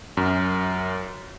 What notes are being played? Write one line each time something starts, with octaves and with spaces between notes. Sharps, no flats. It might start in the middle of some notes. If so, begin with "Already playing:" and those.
F#2